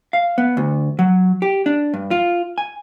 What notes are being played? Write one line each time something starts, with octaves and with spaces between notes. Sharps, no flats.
F5
B3
D2
F#3
G4
D4
G2
F4
G#5